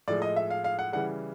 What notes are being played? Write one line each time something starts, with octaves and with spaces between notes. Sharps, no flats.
A2 F3 G#3 D5
D#5
E5
F5
F5
F#5
C#3 E3 G3 F#5